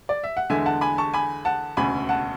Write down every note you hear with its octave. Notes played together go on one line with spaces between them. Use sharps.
D5
E5
F#5
E2 D3 G#3 E5 G#5
F#5 A5
G#5 B5
A5 C#6
G#5 B5
F#5 A5
E1 D2 C#3 G#5 B5
F#5 A5